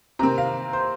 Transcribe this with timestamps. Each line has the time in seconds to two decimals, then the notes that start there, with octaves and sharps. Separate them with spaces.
0.19 C3 D#3 C4 A#5
0.38 F5
0.73 C5